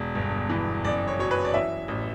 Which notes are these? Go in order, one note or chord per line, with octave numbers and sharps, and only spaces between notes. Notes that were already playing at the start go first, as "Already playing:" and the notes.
Already playing: E1
G1
E3
F#1 D5
C#5
F#3 C#5
B4
D5
E3 E5
A1